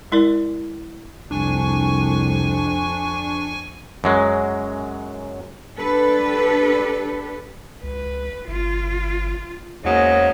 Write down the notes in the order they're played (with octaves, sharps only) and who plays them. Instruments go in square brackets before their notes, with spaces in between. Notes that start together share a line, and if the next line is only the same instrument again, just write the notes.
[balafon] G#3 E4 A#4 D5
[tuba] C2 [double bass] F2 [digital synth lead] D4 [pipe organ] G#5 C#6
[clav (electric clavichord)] F#2 F#3 G#3
[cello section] D4 G4 A4 B4
[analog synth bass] C#2 [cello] B4
[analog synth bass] G1 [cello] F4
[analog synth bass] E2 [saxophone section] G#2 C#3 F#3 [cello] A#3 D#5